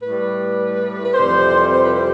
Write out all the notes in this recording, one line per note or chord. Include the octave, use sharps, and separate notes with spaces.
A2 G3 B4
B4
F2 C3 E3 G3 C5
C5
B4
C5